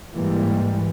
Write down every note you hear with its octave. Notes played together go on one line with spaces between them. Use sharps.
G#2 E3 G3 G#3 A#3